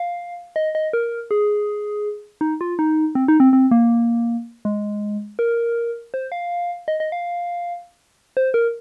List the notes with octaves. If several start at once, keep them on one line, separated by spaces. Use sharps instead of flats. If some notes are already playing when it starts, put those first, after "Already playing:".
Already playing: F5
D#5
D#5
A#4
G#4
D#4
F4
D#4
C4
D#4
C4
C4
A#3
G#3
A#4
C5
F5
D#5
D#5
F5
C5
A#4